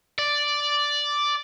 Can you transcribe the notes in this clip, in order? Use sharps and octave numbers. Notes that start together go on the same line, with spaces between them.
D5